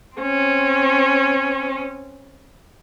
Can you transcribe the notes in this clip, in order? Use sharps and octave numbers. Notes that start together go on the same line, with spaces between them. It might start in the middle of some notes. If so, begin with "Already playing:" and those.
C4 C#4